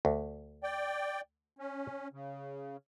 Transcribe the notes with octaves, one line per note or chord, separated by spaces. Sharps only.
D2
D5 G5
C#4
C#3